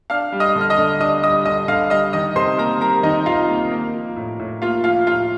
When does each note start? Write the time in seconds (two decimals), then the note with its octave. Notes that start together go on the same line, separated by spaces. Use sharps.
0.10 D4 F5 F6
0.32 G3
0.40 D#5 D#6
0.56 D3
0.61 F6
0.70 D#5 D#6
0.78 D3
1.00 D4 D#5 D#6
1.22 G3 D#5 D#6
1.45 D3 D#5 D#6
1.68 D3 F5 F6
1.90 G3 D#5 D#6
2.13 D#3 D#5 D#6
2.35 C3 C5 C6
2.58 A#3 A#4 A#5
2.81 G3 A#4 A#5
3.03 D#3 D#4 D#5
3.26 C3 F4 F5
3.49 A#3
3.72 A#3
3.94 F3
4.16 A2
4.39 A2
4.62 A#3 F4 F5
4.84 F3 F4 F5
5.07 A2 F4 F5